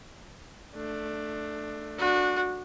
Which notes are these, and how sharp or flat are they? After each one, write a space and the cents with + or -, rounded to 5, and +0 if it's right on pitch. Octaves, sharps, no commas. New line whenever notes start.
A3 +0 D4 +15
D4 +0 F#4 -25